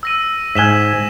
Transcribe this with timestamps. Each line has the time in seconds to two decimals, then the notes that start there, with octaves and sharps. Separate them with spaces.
0.03 E6 A#6 D#7
0.55 G#2 G#5 B6 E7 G7